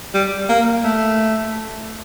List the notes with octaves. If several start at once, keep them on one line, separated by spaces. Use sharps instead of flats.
G3
A#3
A3